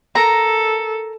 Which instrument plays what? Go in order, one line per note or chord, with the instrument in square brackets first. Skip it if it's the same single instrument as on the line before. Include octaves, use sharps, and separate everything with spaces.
[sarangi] A4 [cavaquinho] A#4 A#5